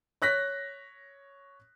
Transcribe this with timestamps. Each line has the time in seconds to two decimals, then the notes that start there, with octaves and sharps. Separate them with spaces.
0.22 C#5 F#6 A#6 B6